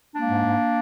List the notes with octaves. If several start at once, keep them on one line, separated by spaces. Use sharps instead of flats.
G#3 A#3 D4
G#2
G#2